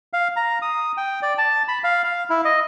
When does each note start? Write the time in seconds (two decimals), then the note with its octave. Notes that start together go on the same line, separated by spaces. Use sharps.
0.13 F5
0.36 A#5
0.62 D#6
0.97 G5
1.22 D5
1.38 A5
1.68 B5
1.84 F5
2.04 F5
2.30 E4
2.45 D#5